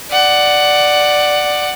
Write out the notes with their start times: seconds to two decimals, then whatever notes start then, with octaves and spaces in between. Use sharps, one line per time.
0.11 D5 F#5